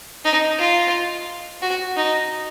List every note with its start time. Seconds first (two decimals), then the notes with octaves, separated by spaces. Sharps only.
0.25 D#4
0.59 F4
1.62 F#4
1.97 D#4